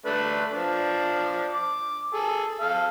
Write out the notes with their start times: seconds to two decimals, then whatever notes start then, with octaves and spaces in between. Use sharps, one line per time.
0.06 A3 D4 B4
0.52 F3 D4
1.53 D6
2.14 G#4 A4
2.61 A4 F5